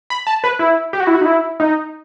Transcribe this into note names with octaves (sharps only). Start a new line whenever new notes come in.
B5
A5
B4
E4
G4
F#4
E4
F#4
D#4
E4
D#4